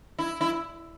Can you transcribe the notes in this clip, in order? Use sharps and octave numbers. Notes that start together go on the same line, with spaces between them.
E4
E4